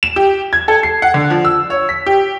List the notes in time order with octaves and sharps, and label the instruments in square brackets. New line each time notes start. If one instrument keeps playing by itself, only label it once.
[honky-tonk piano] E7
G4
G#6
A4
C7
F#5
D3
F3
E6
C#5
B6
G4